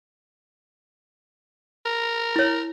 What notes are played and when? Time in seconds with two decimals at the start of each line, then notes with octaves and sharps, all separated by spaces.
1.86 A#4
2.36 E4 C#5